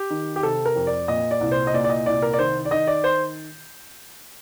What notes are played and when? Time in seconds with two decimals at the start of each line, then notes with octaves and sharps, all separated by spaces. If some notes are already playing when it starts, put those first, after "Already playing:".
Already playing: G4
0.10 D#3
0.36 G4
0.43 C3 A4
0.65 A#4
0.76 F2
0.87 D5
1.08 A#2 D#5
1.31 D5
1.41 C2
1.51 C5
1.67 D#5
1.74 A#2 D5
1.84 D5
1.90 D#5
2.06 C2 D5
2.22 A#4
2.33 D5
2.39 D#3 C5
2.65 D5
2.71 D#3 D#5
2.87 D5
3.04 C5